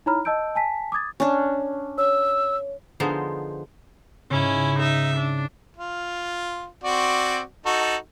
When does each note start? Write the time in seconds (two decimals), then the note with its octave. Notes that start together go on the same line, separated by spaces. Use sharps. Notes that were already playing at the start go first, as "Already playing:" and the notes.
0.06 D#4 E4 C#5 A#5 B5 F6
0.25 D#5 A5 E6 G6 D7
0.55 G#5 A5 B6
0.92 D6 D#6 G#6 A6
1.20 C#4 D4
1.98 C#5 E6
3.00 D3 F3 G#3 B3 D#4 C5
4.30 G#2 C#3 C#4 E4
4.79 D#4 E5
5.17 D4
5.77 F4
6.84 C4 F#4 D5
7.65 D#4 F#4 A4